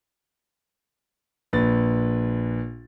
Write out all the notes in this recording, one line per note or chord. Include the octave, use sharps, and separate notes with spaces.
A#1 B4 A6